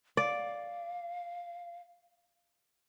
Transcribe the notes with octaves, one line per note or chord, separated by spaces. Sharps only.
D5 F5